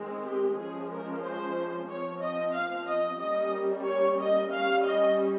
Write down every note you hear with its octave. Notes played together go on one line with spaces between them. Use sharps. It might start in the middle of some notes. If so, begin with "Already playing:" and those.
Already playing: D#3 G#3 C4
G4
F3 G#3 C#4 G#4
A#4
C5
F3 C4 C#5
D#5
F5
D#5
G3 A#3 C#4 D#5
C#5
D#5
G3 C#4 F5
D#5